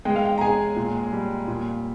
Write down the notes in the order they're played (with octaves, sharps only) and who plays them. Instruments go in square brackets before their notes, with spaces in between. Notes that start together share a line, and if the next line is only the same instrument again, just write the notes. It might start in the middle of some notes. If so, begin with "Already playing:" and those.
[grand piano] G#3 [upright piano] G5
[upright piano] F5
G5
A#5
[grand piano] G#4 [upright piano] G#5
[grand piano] A#2
G3
A#2